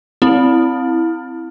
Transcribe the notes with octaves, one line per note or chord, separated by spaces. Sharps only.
C4 E4